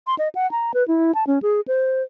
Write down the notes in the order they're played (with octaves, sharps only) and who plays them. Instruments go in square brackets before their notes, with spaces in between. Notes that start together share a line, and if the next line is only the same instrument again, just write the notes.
[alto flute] C6
D#5
F#5
A#5
B4
E4
A5
C#4
G#4
C5